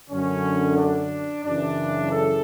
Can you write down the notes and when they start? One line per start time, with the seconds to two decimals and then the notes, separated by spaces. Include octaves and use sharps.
0.10 F#2 D3 C#4
0.77 D4
1.45 F#2 C#3 E3 D4
2.12 A4